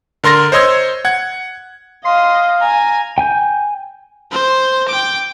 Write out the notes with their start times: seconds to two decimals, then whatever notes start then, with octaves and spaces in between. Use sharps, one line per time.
0.24 D3 A#4 C6 A6 A#6
0.52 C5 C#5 D#5 C6 E6 G#6
1.05 F#5 G#6
2.05 D#5 F5 C6
2.60 G#5 A#5
3.18 G5 G#5 G6
4.31 C5
4.89 G5 D6